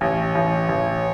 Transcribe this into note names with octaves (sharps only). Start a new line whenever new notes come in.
A1 C#5
A1
A1